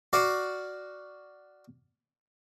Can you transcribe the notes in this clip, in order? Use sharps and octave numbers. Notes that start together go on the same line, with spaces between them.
F#4 D5 F5